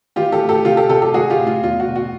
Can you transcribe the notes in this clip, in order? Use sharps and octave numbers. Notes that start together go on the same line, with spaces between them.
E3 F4 G4
G4 A4
A2
G4 A4
C3 F4 G4
G4 A4
C3 G4 A4
G4 A4
G#3 F#4 G#4
F4 G4
A2
F4
E2 F4
F#4
B2
F#4